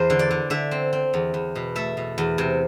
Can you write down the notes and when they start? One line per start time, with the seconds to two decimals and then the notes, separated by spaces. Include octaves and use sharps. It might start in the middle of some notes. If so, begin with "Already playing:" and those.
Already playing: E2 C5
0.10 D3
0.19 D5
0.31 D3
0.50 D3 E5
0.71 C4
0.93 C4
1.14 E2
1.34 E2
1.55 B2
1.76 A3 E5
1.97 B2
2.18 E2
2.38 C3